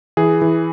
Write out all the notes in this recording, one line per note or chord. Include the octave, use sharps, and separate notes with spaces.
E3 G#4
E3